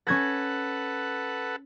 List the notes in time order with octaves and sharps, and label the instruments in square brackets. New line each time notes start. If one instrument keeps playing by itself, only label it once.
[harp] C#4 G#6 A#6 [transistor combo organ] A4 B4 F#5